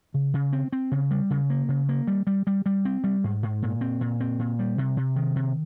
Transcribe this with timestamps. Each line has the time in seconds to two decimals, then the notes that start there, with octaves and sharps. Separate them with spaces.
0.14 C#3
0.34 C#3
0.53 C4
0.72 C4
0.91 C#3
1.11 G3
1.30 C#3
1.50 A#3
1.69 C#3
1.89 A#3
2.07 G3
2.27 G3
2.47 G3
2.66 G3
2.85 C4
3.04 G3
3.24 G#2
3.43 G#2
3.62 A#2
3.81 C4
4.01 A#2
4.20 C4
4.39 A#2
4.59 G3
4.78 C3
4.97 C3
5.16 D#3
5.36 C3